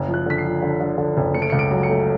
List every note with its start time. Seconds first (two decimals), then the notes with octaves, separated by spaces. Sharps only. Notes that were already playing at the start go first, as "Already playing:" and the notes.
Already playing: F#1
0.08 F3
0.14 F#6
0.26 D3 B6
0.38 C7
0.45 F3
0.62 D3
0.80 D3
0.98 D3
1.17 F#1
1.34 A3 C#7
1.42 D7
1.50 C#2 C#7
1.59 D7
1.71 F#3
1.83 C#7
1.90 A3